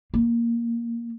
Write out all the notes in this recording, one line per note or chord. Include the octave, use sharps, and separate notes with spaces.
A#3